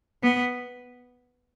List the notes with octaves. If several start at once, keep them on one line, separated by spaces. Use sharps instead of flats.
B3